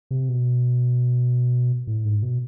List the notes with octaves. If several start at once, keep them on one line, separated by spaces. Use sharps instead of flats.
C3
B2
A2
G#2
B2